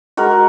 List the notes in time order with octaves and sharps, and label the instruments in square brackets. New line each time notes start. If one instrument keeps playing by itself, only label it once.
[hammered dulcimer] G#3 F#4 A#4